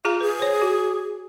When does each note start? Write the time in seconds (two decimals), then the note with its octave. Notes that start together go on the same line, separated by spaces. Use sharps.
0.05 F4 G#4 F5 A#5
0.21 G#4 B4
0.40 C5 C#5
0.62 F#4